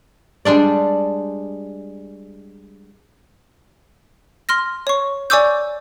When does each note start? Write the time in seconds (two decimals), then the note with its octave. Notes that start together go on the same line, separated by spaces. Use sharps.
0.45 G3 G#3 D4 D5
4.49 C6 F6 A#6
4.87 C#5 C#6
5.30 D5 G#5 C#6 D6 E6 G6